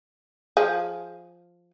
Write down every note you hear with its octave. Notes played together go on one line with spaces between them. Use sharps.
F3 G#4